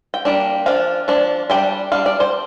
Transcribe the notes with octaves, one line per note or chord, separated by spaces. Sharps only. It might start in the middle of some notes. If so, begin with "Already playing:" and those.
G5
G3 A#3 D4
F3 D4 F5
F3 D4
G3 D4 G5
G3 D4 F5
D5
C5